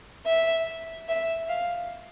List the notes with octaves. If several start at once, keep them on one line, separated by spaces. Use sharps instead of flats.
E5
E5
F5